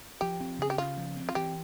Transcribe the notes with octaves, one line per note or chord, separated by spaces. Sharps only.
F3 G4
C4
C#3 G#4
G4
C#3 F4
F3
C4
F4
E3 G4